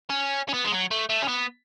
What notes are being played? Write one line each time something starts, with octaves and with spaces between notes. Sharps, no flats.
C#4
C#4
B3
G#3
F#3
A3
A3
C#4
B3